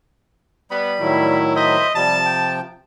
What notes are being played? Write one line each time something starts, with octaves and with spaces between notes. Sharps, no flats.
G3 B3 B5
A2 D#3 F#3 E4
C5 D#5 E5 B5
C3 F3 G3 A5
G5